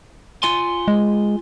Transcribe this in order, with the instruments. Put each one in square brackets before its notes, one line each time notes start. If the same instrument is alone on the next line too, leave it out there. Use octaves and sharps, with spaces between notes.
[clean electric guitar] F4 G#5 C6
[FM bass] G#3